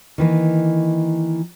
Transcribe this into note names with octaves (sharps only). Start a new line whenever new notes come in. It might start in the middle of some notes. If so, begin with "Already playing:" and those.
D#3 E3 A#3